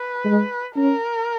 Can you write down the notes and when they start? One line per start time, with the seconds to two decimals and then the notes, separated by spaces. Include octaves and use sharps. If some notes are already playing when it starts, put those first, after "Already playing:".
Already playing: B4
0.25 G#3
0.76 C#4 A#4